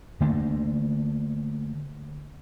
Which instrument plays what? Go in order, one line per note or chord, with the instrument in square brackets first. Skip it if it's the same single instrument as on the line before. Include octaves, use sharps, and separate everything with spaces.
[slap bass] D3 A3 A#3 D4